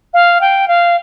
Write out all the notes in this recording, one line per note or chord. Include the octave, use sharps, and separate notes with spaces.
F5
G5
F5